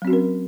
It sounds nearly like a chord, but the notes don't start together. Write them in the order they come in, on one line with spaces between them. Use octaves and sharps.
F#3 C4 F#4 C#4 A#4